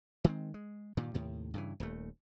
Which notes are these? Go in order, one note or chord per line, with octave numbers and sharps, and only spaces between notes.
D#3 G#3 C4
G#3
G2 A#2 D#3
D#2 A2 C3
G2 C#3 E3
D#1 D#2 A3